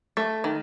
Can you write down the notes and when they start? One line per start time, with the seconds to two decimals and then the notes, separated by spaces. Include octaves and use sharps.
0.17 A3
0.44 D#3